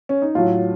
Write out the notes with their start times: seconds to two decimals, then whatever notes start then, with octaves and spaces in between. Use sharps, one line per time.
0.09 C#4
0.22 D#4
0.35 A2 F#3 F4